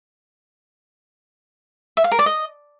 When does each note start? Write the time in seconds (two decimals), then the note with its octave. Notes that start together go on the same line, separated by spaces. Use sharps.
1.97 E5
2.04 F5
2.12 A#4
2.19 D5
2.26 D#5